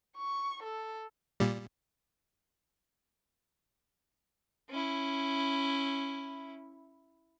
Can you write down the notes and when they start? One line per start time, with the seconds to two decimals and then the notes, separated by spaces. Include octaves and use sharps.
0.17 C#6
0.63 A4
1.40 A#2 G3
4.70 C#4 E4